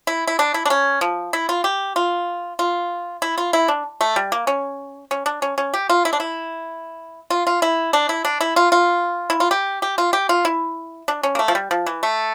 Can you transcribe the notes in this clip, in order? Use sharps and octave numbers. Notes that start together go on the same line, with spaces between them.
E4
E4
D4
E4
D4
C#4
F3
E4
F4
G4
F4
F4
E4
F4
E4
D4
A3
G3
A#3
C#4
C#4
D4
C#4
C#4
G4
F4
E4
D4
E4
F4
F4
E4
D4
E4
D4
E4
F4
F4
E4
F4
G4
G4
F4
G4
F4
E4
D4
C#4
A#3
A3
F3
G3
F3
E3
A3